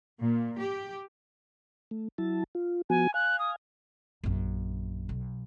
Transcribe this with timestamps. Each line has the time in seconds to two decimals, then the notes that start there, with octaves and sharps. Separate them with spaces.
0.19 A#2
0.58 G4
1.91 A3
2.18 F#3 E4 A5
2.55 F4
2.90 F3 B3 F#4 G#5
3.14 F5 G#5 F#6
3.39 D#6
4.24 A#1 F#2
5.09 B1